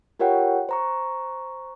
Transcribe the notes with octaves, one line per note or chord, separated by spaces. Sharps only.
F4 G4 A#4 C#5 F#5 G5
C5 A#5 C#6